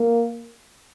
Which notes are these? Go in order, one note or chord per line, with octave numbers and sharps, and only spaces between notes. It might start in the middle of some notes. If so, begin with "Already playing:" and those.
Already playing: A#3